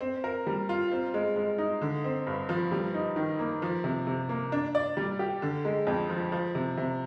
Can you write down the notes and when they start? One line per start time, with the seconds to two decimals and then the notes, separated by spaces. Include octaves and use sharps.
0.01 C4
0.24 A#4
0.47 G3
0.69 F4
0.92 C4
1.14 G#3
1.36 G#3
1.58 D#4
1.81 D3
2.04 C4
2.27 G2
2.49 F3
2.71 G3
2.94 D#4
3.16 D#3
3.39 A#3
3.62 F3
3.84 C3
4.07 C3
4.29 A#3
4.52 D4
4.75 D5
4.97 G3
5.19 G4
5.42 D3
5.65 G#3
5.87 F2
6.10 F3
6.32 F3
6.55 C3
6.77 C3